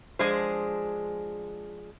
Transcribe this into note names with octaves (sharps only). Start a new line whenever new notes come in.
F3 G#3 D4 G#4 C5